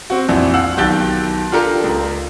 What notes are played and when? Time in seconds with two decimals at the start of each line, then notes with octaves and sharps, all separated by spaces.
0.10 C4 F#4
0.29 A#1 F2 E3
0.54 F5 F#5 E6
0.77 B1 D#3 G4 F#6 A6 G7
1.52 D4 F4 G4 A4 A#4
1.84 C#2